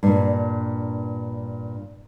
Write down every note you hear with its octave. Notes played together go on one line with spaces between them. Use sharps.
G2 A#2